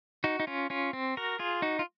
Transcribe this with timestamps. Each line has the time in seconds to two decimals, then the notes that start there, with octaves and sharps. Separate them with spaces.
0.24 D#4 F#4
0.40 D#4
0.47 C#4 F4
0.70 C#4 F4
0.93 C4
1.17 F#4 A#4
1.39 F4 G#4
1.62 D#4 F#4
1.79 F4